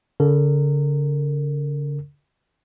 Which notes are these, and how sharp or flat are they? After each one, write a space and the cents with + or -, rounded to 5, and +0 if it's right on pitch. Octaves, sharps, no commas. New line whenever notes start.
D3 -40 A#4 -25